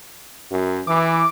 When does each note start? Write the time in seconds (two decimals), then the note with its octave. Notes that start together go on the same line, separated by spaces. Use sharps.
0.52 F#2
0.87 E3 D6